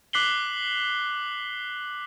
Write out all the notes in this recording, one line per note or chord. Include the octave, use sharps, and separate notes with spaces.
D6 F#6 B6 C7 F#7 G7